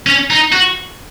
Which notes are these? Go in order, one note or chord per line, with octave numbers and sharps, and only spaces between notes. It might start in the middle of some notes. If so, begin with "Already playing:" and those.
C#4
D#4
F#4